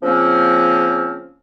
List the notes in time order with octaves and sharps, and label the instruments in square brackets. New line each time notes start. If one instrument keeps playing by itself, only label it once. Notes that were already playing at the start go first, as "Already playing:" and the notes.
[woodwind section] C#3 F3 A#3 C4 C#4